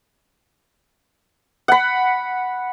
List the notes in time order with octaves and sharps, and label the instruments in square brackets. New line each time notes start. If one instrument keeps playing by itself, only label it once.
[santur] F#5 B5